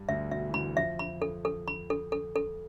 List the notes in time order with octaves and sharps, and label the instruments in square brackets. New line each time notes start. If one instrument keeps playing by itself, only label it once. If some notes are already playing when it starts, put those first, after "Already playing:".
Already playing: [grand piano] G2 G3
[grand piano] D2 D3 [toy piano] E5
[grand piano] B2 [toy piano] E5
[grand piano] E3
[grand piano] D2 D3 [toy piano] B5
[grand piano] F2 F3 [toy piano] E5
[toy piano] B5
A4
A4
B5
A4
A4
A4